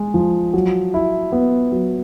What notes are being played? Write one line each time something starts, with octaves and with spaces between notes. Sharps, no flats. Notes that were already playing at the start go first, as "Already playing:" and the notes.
Already playing: G#3
F3
F#3
E4
B3
F#3